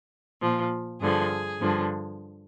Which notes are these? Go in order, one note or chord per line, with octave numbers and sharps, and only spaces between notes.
A#2 F3
G2 D3 F3 G#4
G2 D3 F3